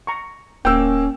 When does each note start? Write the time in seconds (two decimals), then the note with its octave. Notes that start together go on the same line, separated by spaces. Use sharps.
0.07 A#5 C#6
0.65 D1 A#3 C#4 G5 E6